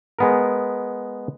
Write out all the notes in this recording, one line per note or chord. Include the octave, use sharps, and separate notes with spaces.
G#3 B3 A#4